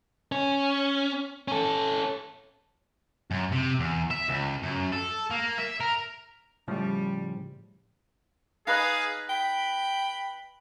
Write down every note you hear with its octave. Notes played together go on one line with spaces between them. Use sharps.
C#4
C#4 A4
F#2
C3
E2
E5
C#2
F#2
A4
A#3
E5
A#4
A2 C#3 F3 G3
D#4 G#4 B4 D#5 F5
G5 B5